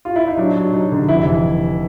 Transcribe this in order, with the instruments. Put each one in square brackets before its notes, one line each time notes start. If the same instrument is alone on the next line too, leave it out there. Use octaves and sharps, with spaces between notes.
[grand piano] F4
E4
D#4
F#3 D4
F#3
F#3 D#4
D3
F1 E4
E3